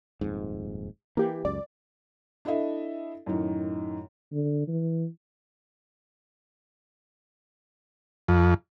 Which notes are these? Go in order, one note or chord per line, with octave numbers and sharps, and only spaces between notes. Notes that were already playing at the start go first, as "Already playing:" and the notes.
D#1 F2 G#2
E3 A#3 G4
C#2 F#2 D5
D4 E4 A4 D#5 E5
F#2 A2 D#3
D3
E3
F2